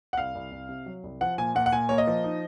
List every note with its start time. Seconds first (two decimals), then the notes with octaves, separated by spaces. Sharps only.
0.13 F#5
0.17 C2 F5
0.35 C2
0.52 C2
0.69 C3
0.86 F#3
1.03 C2
1.21 F3 F#5
1.38 A#2 G#5
1.55 A#2 F#5
1.66 F#5
1.72 A#2 G#5
1.89 A#3 C#5
1.98 D#5
2.07 F3
2.24 D#4